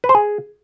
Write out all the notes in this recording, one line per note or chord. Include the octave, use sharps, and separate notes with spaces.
B4
C5
G#4